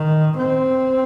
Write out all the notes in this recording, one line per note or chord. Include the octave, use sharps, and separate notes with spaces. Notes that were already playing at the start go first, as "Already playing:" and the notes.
Already playing: D#3
C4